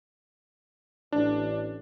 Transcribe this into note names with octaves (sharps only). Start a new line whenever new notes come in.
A1 D4